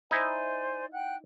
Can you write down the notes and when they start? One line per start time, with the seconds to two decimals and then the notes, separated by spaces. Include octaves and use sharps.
0.11 D#4 E4 C5 D5 G#5
0.92 F#5 G5 F#6